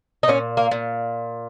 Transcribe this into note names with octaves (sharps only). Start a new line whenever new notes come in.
D#4
A#2 C#4
A#3
A#2